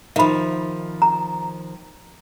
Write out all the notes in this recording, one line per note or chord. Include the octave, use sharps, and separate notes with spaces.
D#3 F3 E5 B5
A#5